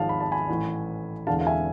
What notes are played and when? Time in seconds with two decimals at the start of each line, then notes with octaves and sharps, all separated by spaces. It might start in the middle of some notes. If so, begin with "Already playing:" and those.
Already playing: G#1 G#2 F3 G#3 F5 A5
0.09 B5
0.20 A5
0.32 G#5 B5
0.49 A1 A2 E3
1.27 E1 E2 D3 G#3 F5 A5
1.41 F5
1.47 E5 G#5